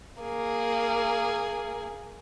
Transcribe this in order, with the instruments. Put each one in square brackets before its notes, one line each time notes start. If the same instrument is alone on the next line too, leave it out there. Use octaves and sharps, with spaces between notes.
[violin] A#3 G#4